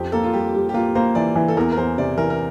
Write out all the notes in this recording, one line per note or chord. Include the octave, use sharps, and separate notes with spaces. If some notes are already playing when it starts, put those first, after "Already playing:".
Already playing: F2 G4
A#3 A4
F4
G3 G4
G3
G4
A#3 F4
A#3 C5
E3 D5
E3
A4
E2 A#4
A#4
E2 C5
C3 D5
E3 A#4
A#4